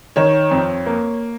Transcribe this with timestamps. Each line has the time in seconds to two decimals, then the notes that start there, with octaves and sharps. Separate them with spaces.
0.16 D#3 C#5
0.51 F2
0.86 A#3